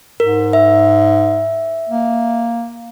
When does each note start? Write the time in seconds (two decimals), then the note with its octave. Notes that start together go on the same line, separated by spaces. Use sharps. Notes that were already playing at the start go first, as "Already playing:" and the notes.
0.20 G#2 A#4
0.53 E5
1.89 A#3